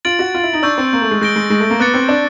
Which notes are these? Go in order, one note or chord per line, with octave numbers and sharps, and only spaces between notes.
F4 A6 D7 F#7
F#4
F4
E4
D#4
D4 C#6 E6 G6
C4
A#3
A3
G#3
G#3 G6 A#6 D7 G7
G#3
G#3
A3
A#3
B3 D6 F#6 A6 C#7
C4
D4